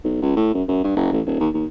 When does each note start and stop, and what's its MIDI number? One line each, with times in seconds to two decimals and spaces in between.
0.04 0.21 35
0.22 0.31 37
0.36 0.53 45
0.54 0.63 42
0.68 0.83 42
0.84 0.94 43
0.96 1.08 30
1.12 1.21 33
1.26 1.35 27
1.39 1.49 39
1.54 1.65 39